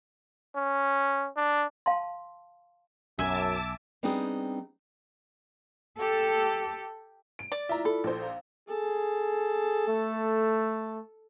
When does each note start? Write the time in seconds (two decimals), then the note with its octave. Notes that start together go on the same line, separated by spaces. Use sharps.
0.55 C#4
1.36 D4
1.86 F5 A5 C6
3.19 B1 F#2 E5 G#5 A5 D6 E6
4.03 G3 B3 C4 D4 D#4 G#4
5.99 G4 A4
7.39 D7
7.52 D5
7.69 E4 F4 E5 A#5
7.85 A4 B5
8.04 A#1 C5
8.22 F5 A#5
8.69 G#4 A4
9.88 A3